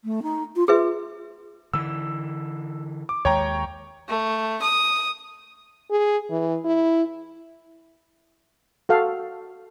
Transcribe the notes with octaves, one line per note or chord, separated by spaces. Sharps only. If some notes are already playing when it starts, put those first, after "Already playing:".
A3
D#4
F4
F4 G#4 B4 E5
D3 E3 E6
D6
D#2 G#3 C#5 G5 A#5
A3
D#6
G#4
E3
E4
F#4 A4 F5